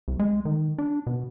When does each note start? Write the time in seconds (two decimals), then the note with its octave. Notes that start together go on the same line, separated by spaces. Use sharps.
0.08 C2
0.19 G#3
0.45 D#3
0.78 D4
1.07 B2